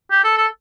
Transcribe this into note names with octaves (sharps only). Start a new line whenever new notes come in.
G4
A4
A4